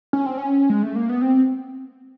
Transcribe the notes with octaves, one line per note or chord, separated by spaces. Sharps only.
C#4
C4
C#4
G#3
A3
A#3
B3
C4